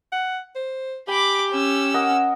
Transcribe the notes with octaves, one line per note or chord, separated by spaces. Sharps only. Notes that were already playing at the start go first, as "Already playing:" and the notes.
F#5
C5
G4 G#5 B5 D6
C#4 E6
A#4 D#5 F#5